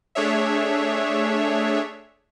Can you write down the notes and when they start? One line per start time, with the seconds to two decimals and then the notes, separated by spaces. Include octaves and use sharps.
0.15 A3 D4 G#4 C#5 E5